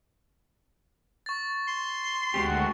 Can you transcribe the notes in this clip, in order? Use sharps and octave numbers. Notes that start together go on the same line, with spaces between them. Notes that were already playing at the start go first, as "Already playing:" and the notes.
C#6 A6
C6
D2 G#3 C4 F#4 G4